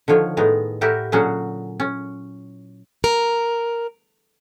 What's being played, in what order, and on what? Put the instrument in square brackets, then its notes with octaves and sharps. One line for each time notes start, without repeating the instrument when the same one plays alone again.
[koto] D3 D#3 F3 C#5
A2 D#3 G#3 B3 A#5
A2 E4 F#4 G4 A#4 E5
A#2 D3 F#3 C#4 F#4 G#4
C#4
[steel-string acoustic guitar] A#4